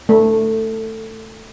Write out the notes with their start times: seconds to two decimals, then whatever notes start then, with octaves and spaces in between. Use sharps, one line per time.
0.09 A3